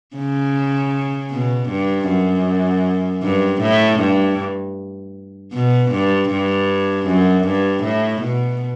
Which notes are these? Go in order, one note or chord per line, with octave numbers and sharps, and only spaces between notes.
C#3
B2
G2
F#2
G2
A2
G2
B2
G2
G2
F#2
G2
A2
B2